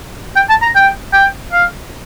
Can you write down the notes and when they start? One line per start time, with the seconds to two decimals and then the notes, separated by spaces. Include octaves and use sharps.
0.36 G5
0.49 A5
0.62 A#5
0.75 G5
1.13 G5
1.52 F5